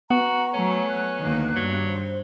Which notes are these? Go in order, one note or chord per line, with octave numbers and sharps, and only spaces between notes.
B3 F#4 F#5 A#5 C#6
F#3 A3 C#4
F#6
D2 D#3 A#3
G2 F#3
C5